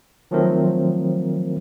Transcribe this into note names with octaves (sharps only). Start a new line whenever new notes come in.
D#3 F3 F#3 A3 C4 A#4